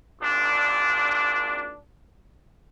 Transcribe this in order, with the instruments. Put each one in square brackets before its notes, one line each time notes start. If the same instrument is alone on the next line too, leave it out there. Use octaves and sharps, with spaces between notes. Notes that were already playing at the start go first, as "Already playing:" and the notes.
[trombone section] G#1 A#2 D4